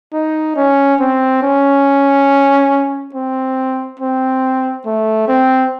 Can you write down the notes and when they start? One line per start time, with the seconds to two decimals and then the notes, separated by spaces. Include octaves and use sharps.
0.13 D#4
0.56 C#4
1.00 C4
1.43 C#4
3.14 C4
3.99 C4
4.86 A3
5.28 C4